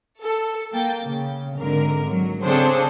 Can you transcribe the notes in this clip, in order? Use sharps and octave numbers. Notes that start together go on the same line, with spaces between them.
A4
A#3 G5 A6
C#3
G#1 D3 A#4
F#3
C#3 C4 D4 G#4 A4 C5